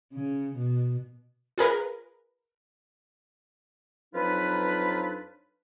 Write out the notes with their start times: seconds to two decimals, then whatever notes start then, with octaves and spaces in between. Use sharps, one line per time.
0.13 C#3
0.54 B2
1.58 F4 G#4 A#4 B4
4.14 F2 F#3 D4 D#4 F4 B4